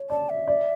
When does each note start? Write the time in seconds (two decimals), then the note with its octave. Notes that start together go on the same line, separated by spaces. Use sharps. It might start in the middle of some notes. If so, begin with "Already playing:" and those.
Already playing: C#5
0.10 D5 A5
0.30 E5
0.47 D5